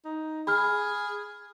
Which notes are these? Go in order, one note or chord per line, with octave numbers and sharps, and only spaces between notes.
D#4
G#4 B5 F6